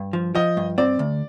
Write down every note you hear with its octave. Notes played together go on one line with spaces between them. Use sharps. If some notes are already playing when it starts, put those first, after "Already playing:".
Already playing: G2
F3
F3 D#5
G2
C4 D5
D2